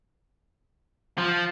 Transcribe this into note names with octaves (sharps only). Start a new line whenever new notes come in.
F3